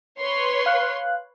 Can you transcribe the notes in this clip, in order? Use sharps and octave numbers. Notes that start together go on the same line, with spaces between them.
B4 C#5 C6
F5 F#6